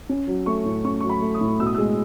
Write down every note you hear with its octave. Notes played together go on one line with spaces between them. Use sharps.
C#4
F#3
A3 C#6
A2
C#4 C#6
F#3 C#6
B5
A3
D#6
A2
B2 E6
D#6
G#3 E6